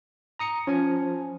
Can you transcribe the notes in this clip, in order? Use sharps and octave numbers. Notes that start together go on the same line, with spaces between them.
A#5 D#6 C#7
F3 C#4 G#5